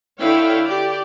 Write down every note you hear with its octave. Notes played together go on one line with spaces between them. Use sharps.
D3 E4 C#5 F5 G5
G4 D5